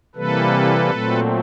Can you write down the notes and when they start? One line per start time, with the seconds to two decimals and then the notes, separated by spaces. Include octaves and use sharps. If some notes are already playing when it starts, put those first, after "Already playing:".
0.15 C3 E3 G3 A#3 A4 B4
0.91 A#2 F#3 A3 C4